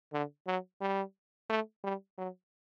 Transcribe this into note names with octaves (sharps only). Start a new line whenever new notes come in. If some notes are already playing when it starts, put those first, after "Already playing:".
D3
F#3
G3
A3
G3
F#3